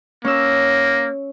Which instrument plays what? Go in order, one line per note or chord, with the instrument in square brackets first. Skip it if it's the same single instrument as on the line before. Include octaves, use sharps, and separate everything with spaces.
[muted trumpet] A#3 [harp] C#4 E6